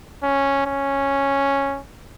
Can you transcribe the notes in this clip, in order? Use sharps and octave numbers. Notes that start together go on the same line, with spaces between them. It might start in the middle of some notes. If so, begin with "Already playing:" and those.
C#4
C#4